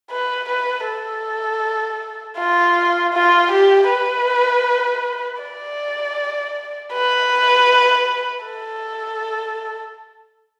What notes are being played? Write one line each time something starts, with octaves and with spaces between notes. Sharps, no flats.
B4
B4
A4
F4
F4
G4
B4
D5
B4
A4